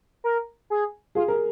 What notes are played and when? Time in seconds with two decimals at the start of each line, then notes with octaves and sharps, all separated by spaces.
0.24 A#4
0.70 G#4
1.15 F4 G#4
1.28 A#4